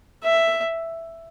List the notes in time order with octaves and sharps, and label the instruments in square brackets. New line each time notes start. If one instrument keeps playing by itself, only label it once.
[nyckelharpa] E5